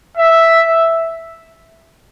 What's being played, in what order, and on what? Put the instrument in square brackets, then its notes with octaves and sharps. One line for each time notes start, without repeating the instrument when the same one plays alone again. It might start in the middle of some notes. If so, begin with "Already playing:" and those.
[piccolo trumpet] E5